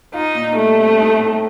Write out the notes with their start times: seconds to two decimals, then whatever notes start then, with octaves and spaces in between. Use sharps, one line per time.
0.14 D#4 F4
0.35 A#2
0.56 G3 A3
0.78 C4
0.98 D#4
1.19 A2